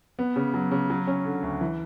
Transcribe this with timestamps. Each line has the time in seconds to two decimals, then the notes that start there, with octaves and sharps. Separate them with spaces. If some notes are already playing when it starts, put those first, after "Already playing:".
0.19 B3
0.36 C#3
0.54 F#3
0.71 C#3
0.90 F#3
1.08 C#4
1.25 D3
1.43 D2
1.61 E3